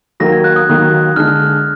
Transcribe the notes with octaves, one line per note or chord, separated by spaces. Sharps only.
D#2 D#3 F#3 A#3 A#6
G#6
F#6
D#6
D#2 D#3 F#3 A#3
D3 G#3 D4 F6